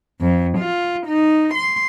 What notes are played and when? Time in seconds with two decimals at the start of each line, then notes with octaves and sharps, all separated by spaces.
0.21 F2
0.58 F4
1.07 D#4
1.56 C6